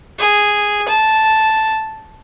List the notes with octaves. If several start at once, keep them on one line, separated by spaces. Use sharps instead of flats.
G#4
A5